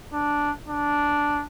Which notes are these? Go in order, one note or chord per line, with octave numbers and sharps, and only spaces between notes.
D4
D4